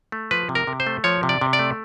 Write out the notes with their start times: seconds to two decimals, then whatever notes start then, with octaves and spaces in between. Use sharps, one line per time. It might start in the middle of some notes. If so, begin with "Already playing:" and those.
0.12 A3
0.31 F3 B4
0.49 C3
0.55 A#4
0.67 C3
0.80 C5
0.87 A3
1.04 F3 C#5
1.23 C3
1.29 D5
1.41 C3
1.53 D5
1.59 A3